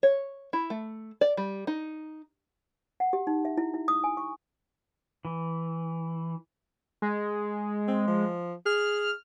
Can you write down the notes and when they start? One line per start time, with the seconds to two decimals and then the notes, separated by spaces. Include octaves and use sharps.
0.03 C#5
0.53 E4
0.70 A3
1.21 D5
1.37 G3
1.67 D#4
3.00 F#5
3.13 G4
3.27 D#4
3.45 E5
3.58 E4
3.74 E4
3.88 D#6
4.04 G#5
4.17 C#6
5.25 E3
7.02 G#3
7.88 C4
8.07 F3
8.66 G#4 F6